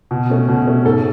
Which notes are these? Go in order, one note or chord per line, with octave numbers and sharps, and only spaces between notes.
B2
A3 C#4
B2
A3 C#4
G#2 A4